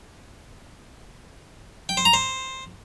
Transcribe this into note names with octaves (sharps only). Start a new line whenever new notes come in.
G5
C5
A#5
C5